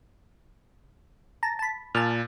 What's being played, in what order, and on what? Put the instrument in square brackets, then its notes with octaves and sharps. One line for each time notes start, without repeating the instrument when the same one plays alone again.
[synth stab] A5 A#5
A5 B5
[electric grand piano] A#2 [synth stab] A5 F6